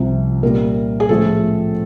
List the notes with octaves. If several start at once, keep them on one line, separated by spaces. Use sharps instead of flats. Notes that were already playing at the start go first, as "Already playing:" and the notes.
Already playing: C2 C3 F3
A#2 G3 A#4
G#4
A2 F3 A3 A4